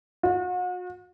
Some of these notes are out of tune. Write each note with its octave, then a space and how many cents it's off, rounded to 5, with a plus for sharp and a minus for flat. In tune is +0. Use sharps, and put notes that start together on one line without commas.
F#4 -40